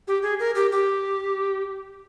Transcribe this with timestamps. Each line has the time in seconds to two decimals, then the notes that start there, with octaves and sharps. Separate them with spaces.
0.08 G4
0.23 G#4
0.40 A#4
0.55 G4
0.72 G4